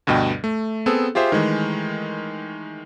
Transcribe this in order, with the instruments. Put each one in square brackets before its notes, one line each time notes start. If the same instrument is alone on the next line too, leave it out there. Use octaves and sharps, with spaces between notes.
[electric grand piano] D2 G2 B2 D#5 G5
A3
B3 C4 G#4 A4
F4 G4 G#4 C5 E5
D#3 E3 G#3 A3